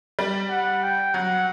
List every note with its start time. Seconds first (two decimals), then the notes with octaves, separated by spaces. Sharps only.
0.19 G3
0.51 F#5
0.83 G5
1.14 F#3 F#5